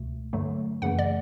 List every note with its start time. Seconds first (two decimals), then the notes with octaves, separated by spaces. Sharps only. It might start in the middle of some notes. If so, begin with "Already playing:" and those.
Already playing: C#2 B2 A3
0.33 G2 D3 F#3 A3
0.82 F#2 C#3 E3 A3 F#5
0.99 D5